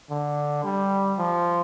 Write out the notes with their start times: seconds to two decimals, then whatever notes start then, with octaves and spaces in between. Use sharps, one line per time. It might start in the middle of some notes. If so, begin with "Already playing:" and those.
0.10 D3
0.64 G3
1.18 F3